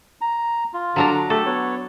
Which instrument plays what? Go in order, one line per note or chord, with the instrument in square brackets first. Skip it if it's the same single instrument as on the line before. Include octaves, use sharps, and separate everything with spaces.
[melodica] A#5
F4
[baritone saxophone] D3 [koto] F#3 D4 A#5
[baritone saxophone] A3 [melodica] G4 [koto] A4
[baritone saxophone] B3 [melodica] C#5